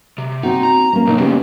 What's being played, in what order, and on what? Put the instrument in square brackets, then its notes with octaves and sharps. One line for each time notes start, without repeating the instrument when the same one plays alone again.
[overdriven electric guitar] C3
[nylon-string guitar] C4 F#4 F#5 [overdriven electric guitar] D#4
[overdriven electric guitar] A#5
[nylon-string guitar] A#3 C#4
[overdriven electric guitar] B1 [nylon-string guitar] A#3 D#4
[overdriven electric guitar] A2 C#3 [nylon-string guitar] B3 C#4 G4